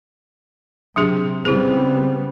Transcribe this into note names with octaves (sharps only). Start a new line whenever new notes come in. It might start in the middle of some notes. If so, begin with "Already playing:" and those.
C3 F#3 D4 G#4
C#3 G3 B3 C4 E4 G#4